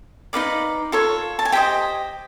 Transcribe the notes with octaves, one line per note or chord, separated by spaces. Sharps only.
D#4 F#4 B4 D5 F5
F4 A4 C#5
A5
G#5
G4 C5 D#5 G5